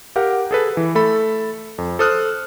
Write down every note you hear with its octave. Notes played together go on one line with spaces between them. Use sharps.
G4 A#4 F5 F#5
G#4 A4 B4
E3
A3 A4 B5
F2
A4 C5 D#6 F6 F#6